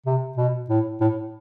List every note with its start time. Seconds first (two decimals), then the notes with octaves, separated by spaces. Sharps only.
0.06 C3
0.37 B2
0.69 A2
1.01 A2